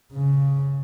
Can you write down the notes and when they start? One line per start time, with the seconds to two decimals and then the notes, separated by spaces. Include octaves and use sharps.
0.13 C#3